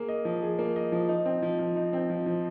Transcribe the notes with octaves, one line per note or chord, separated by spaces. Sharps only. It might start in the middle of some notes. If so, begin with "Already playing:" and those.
Already playing: A#3 G#4
D#5
F3
G#4
A#3
D#5
F3
D#4
C4
F3
F3
D#4
C4
F3
F3